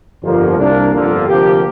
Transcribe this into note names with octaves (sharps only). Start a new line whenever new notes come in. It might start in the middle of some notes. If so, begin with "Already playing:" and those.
G1 F2 F3 A#3
C2 C3 A#3 D4
G1 F2 D3 A#3 F4
D2 C3 F3 A#3 G4